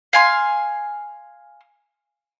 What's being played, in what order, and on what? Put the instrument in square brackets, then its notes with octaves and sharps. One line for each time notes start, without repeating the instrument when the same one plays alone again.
[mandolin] F5 G#5 C6